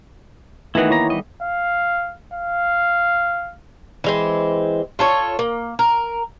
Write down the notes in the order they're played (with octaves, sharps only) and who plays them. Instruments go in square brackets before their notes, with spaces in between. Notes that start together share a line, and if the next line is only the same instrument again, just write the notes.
[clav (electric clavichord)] D#3 E3 B3 [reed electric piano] A3 D#4 [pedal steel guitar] E4 F#4
[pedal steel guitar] A#3 A#5 [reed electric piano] E4 C#5 C#6
[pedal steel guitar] G3 D#5
[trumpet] F5
F5
[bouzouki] E3 G#3 C4
F4 A4 C#5
A#3
A#4